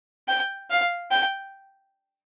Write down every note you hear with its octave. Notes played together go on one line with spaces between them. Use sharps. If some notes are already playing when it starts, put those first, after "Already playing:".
G5
F5
G5